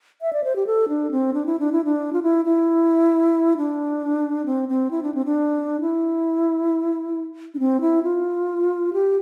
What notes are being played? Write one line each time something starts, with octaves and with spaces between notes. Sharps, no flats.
E5
D5
C5
G4
A4
D4
C4
D4
E4
D4
E4
D4
F4
E4
E4
D4
C4
C4
E4
D4
C4
D4
E4
D4
C4
E4
F4
G4